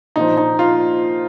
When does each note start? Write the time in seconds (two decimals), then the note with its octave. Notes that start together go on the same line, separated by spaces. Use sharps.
0.16 A#2 F3 D#4
0.37 D#4
0.59 F4